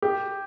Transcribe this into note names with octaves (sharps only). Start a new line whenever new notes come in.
G4